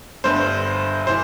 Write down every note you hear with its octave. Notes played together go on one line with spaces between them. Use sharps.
G1 G2 D3 C5
E3 C5